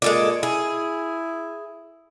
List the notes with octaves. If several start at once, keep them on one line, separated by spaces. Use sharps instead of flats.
A#2 G#3 A4 D5
E4 G#4